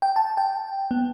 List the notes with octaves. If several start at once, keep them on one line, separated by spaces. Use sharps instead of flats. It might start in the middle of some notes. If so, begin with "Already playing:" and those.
G5
A5
G5
B3